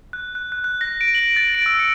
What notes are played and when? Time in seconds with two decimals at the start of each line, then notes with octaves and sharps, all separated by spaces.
0.13 F#6
0.35 F#6
0.52 F#6
0.64 F#6
0.81 A#6
1.01 D7
1.15 F#7
1.36 A6
1.55 D7
1.66 E6
1.80 C#7